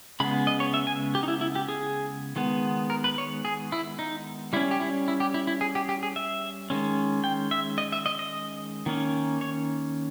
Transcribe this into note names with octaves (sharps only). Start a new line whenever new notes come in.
C#3 G#3 B3 B5
D#5
C#5
E5
G#5
G4
D#4
E4
E4
G4
G#4
D#3 G#3 B3
A#4
B4
C#5
G#4
E4
D#4
G3 C#4 E4
G4
E4
E4
G4
E4
E4
G#4
G4
G4
G#4
E5
D#3 G#3 C#4
G5
E5
D#5
E5
D#5
D#5
D#3 A#3 C#4
C#5